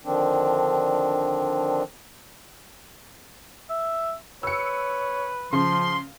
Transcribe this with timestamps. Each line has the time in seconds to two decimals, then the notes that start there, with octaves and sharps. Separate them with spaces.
0.05 D3 D#3 F3 C4 D4
3.70 E5
4.43 B4 C#5 E6 C#7
5.53 C#3 F3 C6